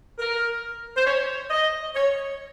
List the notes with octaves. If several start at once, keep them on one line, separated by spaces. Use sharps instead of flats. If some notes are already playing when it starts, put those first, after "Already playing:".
A#4
C5
C#5
D#5
C#5